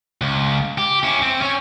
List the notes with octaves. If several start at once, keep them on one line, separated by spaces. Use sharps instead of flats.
C#2
G4
C#4 E4
C4
C#4 C#5